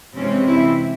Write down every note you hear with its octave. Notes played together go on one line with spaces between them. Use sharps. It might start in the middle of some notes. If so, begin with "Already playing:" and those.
C3 E3 G#3 C4 C#4
E4